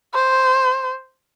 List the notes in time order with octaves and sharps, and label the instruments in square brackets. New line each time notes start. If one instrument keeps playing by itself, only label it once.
[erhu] C5